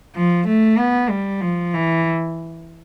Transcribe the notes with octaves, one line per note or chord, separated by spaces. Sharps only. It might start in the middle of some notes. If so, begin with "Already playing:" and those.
F3
A3
B3
G3
F3
E3